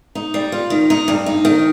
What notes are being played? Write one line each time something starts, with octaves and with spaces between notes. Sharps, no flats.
D#4
G3
F4
D#3
D#4
G2
D#4
D#3